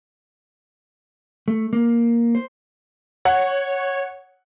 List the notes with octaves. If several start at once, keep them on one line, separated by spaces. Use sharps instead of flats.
A3
A#3
C5
C#5 F#5